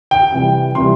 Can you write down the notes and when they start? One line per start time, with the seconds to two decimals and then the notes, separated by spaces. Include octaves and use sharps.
0.11 G5
0.32 C3 E3 G3
0.75 C3 E3 G3 C6